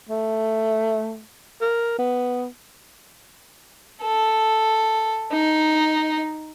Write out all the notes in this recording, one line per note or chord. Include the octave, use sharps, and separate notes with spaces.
A3
A#4
B3
A4
D#4